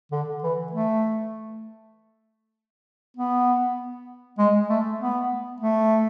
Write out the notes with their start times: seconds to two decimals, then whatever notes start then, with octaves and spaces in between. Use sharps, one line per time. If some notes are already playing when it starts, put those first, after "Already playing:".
0.11 D3
0.43 E3
0.72 A3
3.16 B3
4.38 G#3
4.69 A3
5.00 B3
5.60 A3